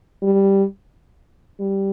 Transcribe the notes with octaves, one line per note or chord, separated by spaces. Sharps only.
G3
G3